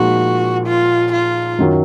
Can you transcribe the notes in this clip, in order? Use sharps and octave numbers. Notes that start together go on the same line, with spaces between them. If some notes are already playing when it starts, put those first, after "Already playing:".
Already playing: A#2 F3 G#3 D#4 F#4
F4
F4
F#2 D#3 F#3